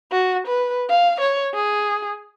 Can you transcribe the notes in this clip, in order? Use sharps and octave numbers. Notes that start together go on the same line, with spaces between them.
F#4
B4
F5
C#5
G#4